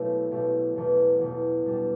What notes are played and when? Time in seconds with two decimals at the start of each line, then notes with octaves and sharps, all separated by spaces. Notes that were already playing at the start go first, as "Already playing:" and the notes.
Already playing: B1 B2 A3 E4 G4
0.30 B1 B2 A3 E4 G4
0.76 E1 E2 B2
1.19 E1 E2 B2
1.65 B2 G3 D4 G4